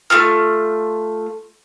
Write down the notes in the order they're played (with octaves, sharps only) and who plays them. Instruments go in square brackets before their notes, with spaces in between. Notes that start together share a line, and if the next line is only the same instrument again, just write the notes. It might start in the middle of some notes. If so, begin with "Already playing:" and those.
[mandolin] A3 A#3 F4 F6